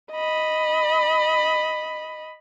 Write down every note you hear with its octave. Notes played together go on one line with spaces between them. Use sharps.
D#5 B5